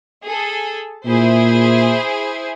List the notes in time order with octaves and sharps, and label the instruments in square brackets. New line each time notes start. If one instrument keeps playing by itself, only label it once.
[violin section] G#4 A4
[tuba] A#2 [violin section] E4 G#4 C5